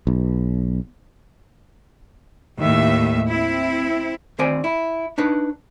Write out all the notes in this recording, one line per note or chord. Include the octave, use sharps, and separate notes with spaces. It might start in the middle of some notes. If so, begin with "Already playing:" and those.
B1
D#2 A2 E5
C4 E4
D2 D#3 C4 C5 D5 G#5
E4
D4 D#4 B4